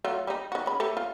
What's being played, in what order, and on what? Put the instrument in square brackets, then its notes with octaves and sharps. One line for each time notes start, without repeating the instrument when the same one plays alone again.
[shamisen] F#3 A3 F4
G3 D#4
D#3 F#4
C#3 B5
A3 G4 A4
F4